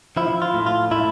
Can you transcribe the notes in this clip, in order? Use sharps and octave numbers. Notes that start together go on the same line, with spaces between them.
F3 E4
F4
A2
F4
A2 E4